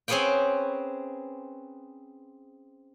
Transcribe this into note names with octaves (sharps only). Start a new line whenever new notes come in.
C4 C#4 G#4 B4 F#5 G5